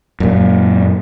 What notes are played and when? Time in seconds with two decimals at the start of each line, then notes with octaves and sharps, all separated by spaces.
0.20 F#2 A#2